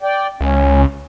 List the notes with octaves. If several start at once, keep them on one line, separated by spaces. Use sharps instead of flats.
D5 G5
C#2 C#4